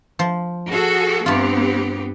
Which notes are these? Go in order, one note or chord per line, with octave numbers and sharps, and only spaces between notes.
F3 C5
F#4 G#4 A4
G2 B3 C4 F4 G4